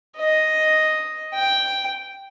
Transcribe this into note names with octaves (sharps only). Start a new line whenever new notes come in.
D#5
G5